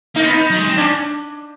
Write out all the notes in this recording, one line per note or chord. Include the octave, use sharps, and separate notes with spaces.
A#3 D#4
C4
B3
D#4
F#3
G#3
C4
C#4 D4